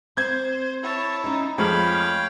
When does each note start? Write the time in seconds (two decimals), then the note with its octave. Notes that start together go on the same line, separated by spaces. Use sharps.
0.17 C4 C5 G6 G#6
0.83 E4 C#5 A5
1.24 C#4 D#4 D#5
1.58 F2 F3 G#3 A3 C#5 F5 G5 B5